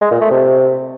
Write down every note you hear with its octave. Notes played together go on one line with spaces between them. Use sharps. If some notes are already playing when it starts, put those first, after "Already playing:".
G#3
A#2
A3
C3